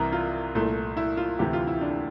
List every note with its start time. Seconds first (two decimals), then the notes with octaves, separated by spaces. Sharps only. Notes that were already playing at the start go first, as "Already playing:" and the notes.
Already playing: C2 C3 E3 A#4
0.13 F4
0.55 C2 A#2 A3 E4
0.97 E4
1.17 F4
1.39 D2 C3 E3 G4
1.53 F4
1.67 E4
1.81 D4